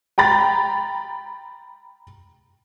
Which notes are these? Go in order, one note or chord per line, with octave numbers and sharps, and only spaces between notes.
G5 A#5 B5 A6